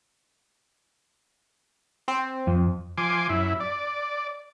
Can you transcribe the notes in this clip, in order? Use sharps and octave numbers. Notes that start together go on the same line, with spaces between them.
C4
F2
F3 G#5 C6 D6
F#2 E4
D5